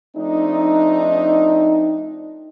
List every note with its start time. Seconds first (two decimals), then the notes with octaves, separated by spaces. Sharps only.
0.17 F3 A3 C4 D4 D#4